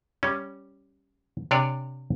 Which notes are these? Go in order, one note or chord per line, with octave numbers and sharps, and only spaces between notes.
G3 C#4
C3 D4 C#5 D5 G#5